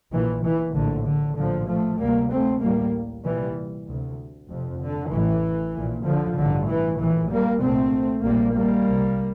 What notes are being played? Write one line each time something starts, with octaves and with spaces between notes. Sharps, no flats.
A#1 A#2 E3
E3
A#1 A2 D3
D3
A#1 A2 D3 F3
F3 A3
D2 C3 G3 A#3
A3 C4
A1 A2 G3 A#3
C2 A#2 E3 G3
D2 C3
F1 F2 C3
D3
A1 A2 E3
A#1 A#2
D3 F3
A1 G2 D3
E3
A#1 A2 E3
G3 A#3
C2 A#2 A3 C4
A#1 A#2 G3 A#3
G3 A#3
C2 C3